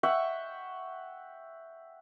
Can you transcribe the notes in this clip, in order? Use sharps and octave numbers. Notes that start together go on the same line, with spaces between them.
E5 F#5 G5 C#6